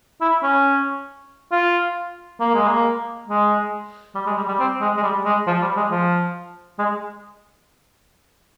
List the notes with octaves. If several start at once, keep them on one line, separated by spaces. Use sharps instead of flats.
E4
C#4
F4
A#3
G#3
A#3
G#3
G3
G#3
G3
G3
C4
G#3
G#3
G3
G#3
F3
G3
G#3
F3
G#3